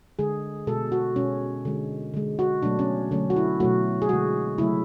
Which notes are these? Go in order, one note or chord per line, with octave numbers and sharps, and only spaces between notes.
D3 G#3 G#4
B2 G#3 A4
F#4
B2 G#3 C#4
D3 G#3
D3 G#3
F#4
B2 F#3 A3 D4
C#4
D3 F#3 A3 C#4
F#4
E4
B2 F#3 A3 F#4
G#4
D3 G#3 F#4
C#3 F#3 A3 E4